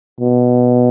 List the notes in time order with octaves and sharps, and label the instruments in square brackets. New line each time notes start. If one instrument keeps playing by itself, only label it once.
[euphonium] B2